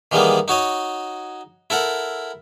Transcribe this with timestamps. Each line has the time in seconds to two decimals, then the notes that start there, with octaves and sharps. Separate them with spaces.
0.12 D#3 E3 G3 G#3 A#3 B3
0.48 D#4 F#4 C#5 D#5
1.70 E4 A4 A#4 F#5